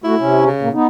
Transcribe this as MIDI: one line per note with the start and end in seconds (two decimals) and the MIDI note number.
0.04 0.15 57
0.04 0.46 64
0.04 0.15 66
0.19 0.48 48
0.19 0.48 61
0.47 0.72 49
0.62 0.69 46
0.62 0.69 58
0.73 0.87 59
0.73 0.87 63